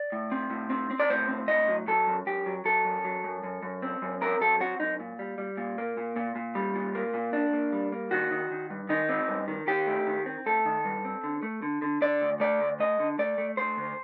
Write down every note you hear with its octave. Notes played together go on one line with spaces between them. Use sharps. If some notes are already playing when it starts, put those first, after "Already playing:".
Already playing: D5
A2
C4
A2
C4
C4
D5
A2 C5
C4
A2 D#5
F#3
F#3 A4
F#2
F#2 G4
F#3
F#3 A4
F#2
F#3
F#2
F#2
F#2
C4
F#2
C4 A#4
F#3 A4
C4 F#4
F#2 D#4
A#2
G3
G3
A#2
A#3
A#2
A#2
A#2
G3
A#2
A#3
A#2
A#2 D4
A#3
G3
A#3
D#3 F#4
D#3
D#3
G2
D#3 D#4
C4
G2
D#3
D#3 G4
A3
D#3
C4
A3 A4
D#3
G2
C4
D3
A3
D3
D3
D3 D5
D2
A3 D5
D2
A3 D#5
D3
A3 D5
A3
A3 C5
D2